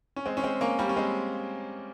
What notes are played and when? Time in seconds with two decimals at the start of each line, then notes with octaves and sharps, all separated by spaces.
0.16 C#4
0.26 G#3 C4
0.37 C#4
0.43 G#3 C4
0.61 A#3 C#4
0.79 G3 A#3
0.89 C#4
0.96 G#3 C4